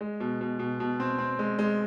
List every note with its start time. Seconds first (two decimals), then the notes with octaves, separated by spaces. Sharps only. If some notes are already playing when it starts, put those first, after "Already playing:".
0.01 G#3
0.20 B2
0.41 B2
0.59 B2
0.80 B2
1.00 C4
1.18 C4
1.39 G#3
1.59 G#3